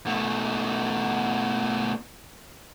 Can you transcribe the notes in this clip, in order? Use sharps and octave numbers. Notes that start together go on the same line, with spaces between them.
B2 A3